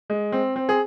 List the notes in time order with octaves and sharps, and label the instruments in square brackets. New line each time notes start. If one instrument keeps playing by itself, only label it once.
[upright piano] G#3
C4
C4
G#4